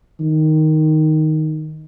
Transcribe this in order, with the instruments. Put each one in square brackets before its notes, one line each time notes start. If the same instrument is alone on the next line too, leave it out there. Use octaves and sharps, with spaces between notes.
[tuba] D#3